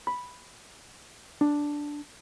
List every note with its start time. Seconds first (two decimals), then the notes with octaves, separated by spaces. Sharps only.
0.07 B5
1.41 D4